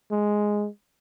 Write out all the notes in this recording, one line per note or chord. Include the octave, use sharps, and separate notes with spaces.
G#3